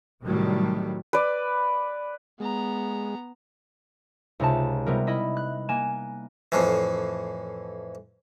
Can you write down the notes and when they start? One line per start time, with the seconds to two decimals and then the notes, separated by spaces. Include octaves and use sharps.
0.24 A2 C3 D#3 F#3 G3
1.13 B4 D5
2.40 G#3 B3 A#5
4.40 C#2 C3 D#4 F4 A5
4.86 C3 G3 B3 A#4
5.07 E4 D#5 B5
5.37 F#6
5.69 A#3 G#5 E7
6.52 F2 A2 E3